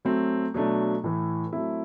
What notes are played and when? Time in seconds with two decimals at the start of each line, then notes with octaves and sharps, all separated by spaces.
0.05 F#3 A3 C4
0.54 B2 F#3 A3 D4
1.04 A2 E3 A3
1.53 F#3 A3 C4 E4